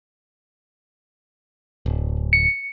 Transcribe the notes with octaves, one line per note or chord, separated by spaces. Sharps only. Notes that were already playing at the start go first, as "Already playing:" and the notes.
D1
C#7